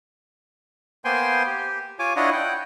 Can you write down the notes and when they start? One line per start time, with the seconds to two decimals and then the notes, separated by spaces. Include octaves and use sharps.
1.05 A#3 B3 C5 G5 G#5 C6
1.46 G4
1.99 F4 C#5 G#5 D6
2.16 D4 E4 F4 C#5 D#5 F#5
2.32 F#5 G5